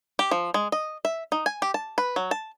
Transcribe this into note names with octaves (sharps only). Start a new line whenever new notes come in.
G4
F3
G#3
D#5
E5
D#4
G#5
G4
A5
B4
F#3
A5